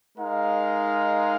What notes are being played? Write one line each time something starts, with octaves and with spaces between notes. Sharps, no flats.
G#3 D#4 A#4 F5